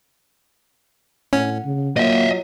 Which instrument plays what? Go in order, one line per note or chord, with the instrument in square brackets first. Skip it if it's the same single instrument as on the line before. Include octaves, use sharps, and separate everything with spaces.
[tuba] A2 [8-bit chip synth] C#4 [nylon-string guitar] F#5
[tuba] C#3
[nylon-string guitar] F#3 F4 C5 [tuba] A#3 [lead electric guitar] D#5 E5